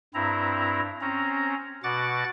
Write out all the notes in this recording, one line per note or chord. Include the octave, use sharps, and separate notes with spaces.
G2 C4 E4 A#5
C4 C#4 A#5
B2 F#4 F#5 D6 F#6 A6